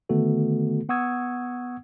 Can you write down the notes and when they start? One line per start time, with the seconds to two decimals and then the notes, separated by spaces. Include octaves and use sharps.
0.09 D3 D#3 A3 B3 F#4 A4
0.89 B3 F#5 C#6 D#6 E6 G#6